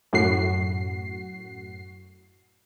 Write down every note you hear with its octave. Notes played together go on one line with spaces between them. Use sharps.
F#2 A2 F#4 C7